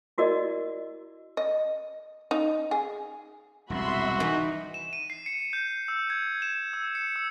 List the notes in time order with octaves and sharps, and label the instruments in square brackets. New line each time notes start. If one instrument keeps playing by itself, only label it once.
[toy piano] E4 F#4 A#4 D5 D#5
[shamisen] D#5
D#4
G#4
[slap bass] E1 C2 [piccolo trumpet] F#4 [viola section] E5 B5 C6
[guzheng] E3 [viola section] D#4
[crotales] E7
D#7
C7
C#7
G6
E6
G#6
E7
E6
C#7
E6